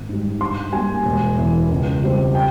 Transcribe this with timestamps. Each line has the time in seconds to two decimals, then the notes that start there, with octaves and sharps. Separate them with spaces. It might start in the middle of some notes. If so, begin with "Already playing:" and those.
Already playing: G#1
0.09 G#2 G3
0.41 G2 C6
0.73 G3 A#3 G#5
1.05 E1
1.38 E2 E3
1.71 C#2
2.02 C#3 G3 C4
2.35 G5